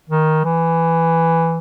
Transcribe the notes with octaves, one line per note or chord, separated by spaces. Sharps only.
D#3
E3